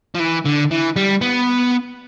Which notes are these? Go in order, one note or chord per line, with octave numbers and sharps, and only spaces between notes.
F3
E3
D3
E3
G3
B3